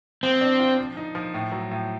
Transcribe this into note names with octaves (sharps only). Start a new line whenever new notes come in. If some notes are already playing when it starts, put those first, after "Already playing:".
F3 C4
D4
F4
F3
D#4
F3
A2
F#3
A2